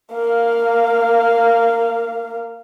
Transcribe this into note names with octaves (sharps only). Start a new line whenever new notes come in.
A#3 F5